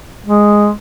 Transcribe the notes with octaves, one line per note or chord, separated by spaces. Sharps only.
G#3